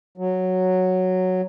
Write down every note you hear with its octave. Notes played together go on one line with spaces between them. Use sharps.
F#3